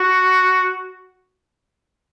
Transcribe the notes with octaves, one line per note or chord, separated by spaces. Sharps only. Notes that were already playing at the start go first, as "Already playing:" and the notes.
Already playing: F#4